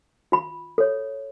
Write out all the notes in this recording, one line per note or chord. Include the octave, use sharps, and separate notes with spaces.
F4 B5
A4 C#5